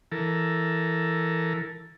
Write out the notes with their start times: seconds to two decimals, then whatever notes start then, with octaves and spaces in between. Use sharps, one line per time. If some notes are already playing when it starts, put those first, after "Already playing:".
0.12 E3 A4 A#4